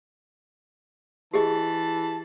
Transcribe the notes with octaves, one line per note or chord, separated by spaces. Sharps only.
E3 G4 G#4 D#5 A5